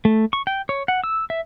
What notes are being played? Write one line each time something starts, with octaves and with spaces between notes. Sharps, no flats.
A3
C#6
G5
C#5
F#5
E6
E5